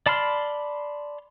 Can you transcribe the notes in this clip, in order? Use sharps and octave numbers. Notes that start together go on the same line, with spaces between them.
D5 A5 B5 C6 F6